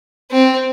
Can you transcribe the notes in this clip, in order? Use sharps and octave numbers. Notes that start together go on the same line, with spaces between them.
C4